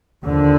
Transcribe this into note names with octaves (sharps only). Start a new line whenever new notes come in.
D#2 D3 F3